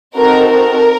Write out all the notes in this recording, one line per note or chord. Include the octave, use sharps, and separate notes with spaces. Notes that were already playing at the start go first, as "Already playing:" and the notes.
C4 D#4 F#4 A4 A#4
A#4